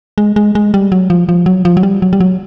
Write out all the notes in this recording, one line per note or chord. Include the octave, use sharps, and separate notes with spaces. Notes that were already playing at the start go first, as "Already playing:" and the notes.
G#3
G#3
G#3
G3
F#3
F3
F3
F#3
F3
F#3
G3
F#3
G3
F#3